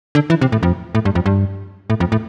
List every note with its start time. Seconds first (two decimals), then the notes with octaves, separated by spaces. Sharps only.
0.15 D3
0.30 E3
0.41 C3
0.52 A2
0.63 F2
0.95 A2
1.05 G2
1.15 F2
1.26 G2
1.90 A2
2.00 F2
2.12 A2